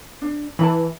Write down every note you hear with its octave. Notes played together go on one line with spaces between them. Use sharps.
D4
E3 A5 B5